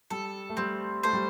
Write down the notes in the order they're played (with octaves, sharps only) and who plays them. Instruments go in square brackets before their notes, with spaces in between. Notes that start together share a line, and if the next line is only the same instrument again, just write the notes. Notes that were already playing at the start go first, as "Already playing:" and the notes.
[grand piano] G3 [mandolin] A4
[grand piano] A3
[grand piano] G3 [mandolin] C4
[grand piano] A3 [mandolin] C5
[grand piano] G3